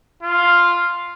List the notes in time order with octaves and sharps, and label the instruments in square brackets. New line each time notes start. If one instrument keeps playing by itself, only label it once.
[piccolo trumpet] F4